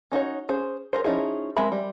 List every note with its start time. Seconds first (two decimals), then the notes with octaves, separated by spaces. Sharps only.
0.12 C#4 D#4 F#4 C#5
0.49 C#4 G#4 C5
0.93 G#4 A#4 C5
1.04 F3 C#4 D#4 E4 G#4
1.57 G#3 C4 A#4 E5 B5
1.72 G3